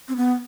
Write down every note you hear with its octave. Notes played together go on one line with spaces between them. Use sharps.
C4
B3